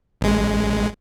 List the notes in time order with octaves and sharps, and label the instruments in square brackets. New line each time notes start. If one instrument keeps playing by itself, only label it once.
[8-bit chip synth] A1 G#3